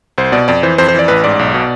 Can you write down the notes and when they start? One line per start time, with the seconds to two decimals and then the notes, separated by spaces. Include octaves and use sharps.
0.18 C2 C5
0.32 B2 D5
0.48 F2 D5
0.63 E3 C5
0.78 F2 C5
0.88 C5
0.94 E3 D5
1.08 A1 B4
1.24 G#2 D5
1.39 B1
1.54 B2